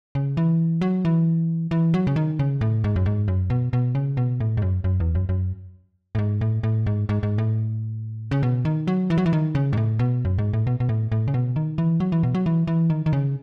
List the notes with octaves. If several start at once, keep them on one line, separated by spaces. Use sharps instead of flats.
C#3
E3
F#3
E3
E3
F#3
C#3
D#3
C#3
A2
G#2
F#2
G#2
F#2
B2
B2
C#3
B2
A2
G#2
F#2
F#2
E2
F#2
F#2
A2
G#2
A2
A2
G#2
G#2
G#2
A2
C#3
B2
D#3
F#3
E3
F#3
E3
D#3
C#3
G#2
A2
B2
F#2
G#2
A2
B2
B2
A2
A2
C#3
B2
D#3
E3
F#3
E3
B2
F#3
E3
E3
D#3
D#3
C#3